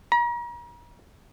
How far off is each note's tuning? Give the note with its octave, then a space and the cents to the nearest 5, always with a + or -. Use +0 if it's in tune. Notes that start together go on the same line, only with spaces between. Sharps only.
A#5 +40